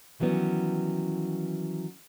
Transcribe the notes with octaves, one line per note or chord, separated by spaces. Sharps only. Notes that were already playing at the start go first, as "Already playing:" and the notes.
D#3 E3 F#3 G3 B3 C#4